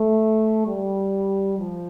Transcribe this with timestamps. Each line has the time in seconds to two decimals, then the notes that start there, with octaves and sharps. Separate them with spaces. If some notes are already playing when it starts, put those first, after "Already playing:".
Already playing: A3
0.67 G3
1.58 F3